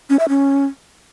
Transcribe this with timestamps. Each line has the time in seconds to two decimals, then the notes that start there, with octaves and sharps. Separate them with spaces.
0.10 C#4
0.19 E5
0.29 C#4